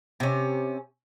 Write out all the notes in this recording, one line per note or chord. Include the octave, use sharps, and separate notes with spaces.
C3 C#4